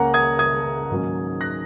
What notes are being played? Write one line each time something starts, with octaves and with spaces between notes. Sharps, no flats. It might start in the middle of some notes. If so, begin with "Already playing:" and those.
Already playing: C#2 C#3 A#3 C#4 F#5 A#5
D#6 G#6
D#6 G#6
G#2 D#3 F#3 A#3 C#4
F#6 A#6